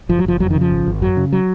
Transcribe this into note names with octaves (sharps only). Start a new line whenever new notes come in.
F#1 F3
F#3
F#1 F3
F2 F#3
D#3
C#3
F3
G#1
G#1
F#2 F#3
C#3
F#3